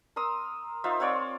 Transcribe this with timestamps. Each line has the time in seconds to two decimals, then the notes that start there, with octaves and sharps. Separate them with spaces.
0.16 A#4 C6 D#6 E6
0.84 D#4 F4 C5 E5
1.00 C4 F4 C#5 D5